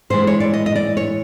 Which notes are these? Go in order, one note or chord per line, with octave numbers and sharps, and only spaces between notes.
A2 E3 G#3 C5
C#5
D5
D#5
D#5
D5
C#5